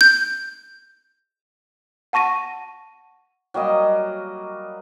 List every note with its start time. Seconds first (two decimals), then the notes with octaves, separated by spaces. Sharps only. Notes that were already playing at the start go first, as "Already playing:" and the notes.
0.01 G6
2.13 F#5 A5 C#6 A#6 D#7
3.54 F#3 G3 A#3 D#5